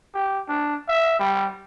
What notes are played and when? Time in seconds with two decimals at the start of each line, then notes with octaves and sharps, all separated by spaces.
0.14 G4
0.48 D4
0.88 E5
1.19 G3